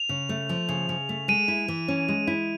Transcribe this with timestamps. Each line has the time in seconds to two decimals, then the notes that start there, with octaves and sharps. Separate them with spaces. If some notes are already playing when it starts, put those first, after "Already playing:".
Already playing: F7
0.09 C#3
0.29 A3
0.49 F3
0.69 C#3
0.89 C#3
1.09 A3
1.28 G#3 D#7
1.48 E4
1.68 E3
1.88 C#4
2.08 G#3
2.27 E4